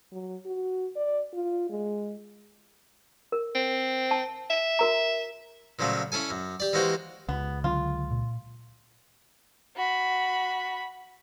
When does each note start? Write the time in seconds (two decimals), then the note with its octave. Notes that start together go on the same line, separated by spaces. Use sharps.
0.12 F#3
0.46 F#4
0.96 D5
1.34 F4
1.70 G#3
3.32 A#4
3.55 C4
4.11 A5
4.50 E5
4.79 F#4 A#4 A#5
5.79 A#2 C#3 F3 F#3 A3
6.12 C#4 E4 A4 G#5
6.31 F#2
6.60 G4 D5
6.73 E3 G#3 A#3 F#4 G4 C5
7.29 C#2 B3
7.64 D3 F#3 C#4 F4
8.11 A#2
9.76 F#4 B5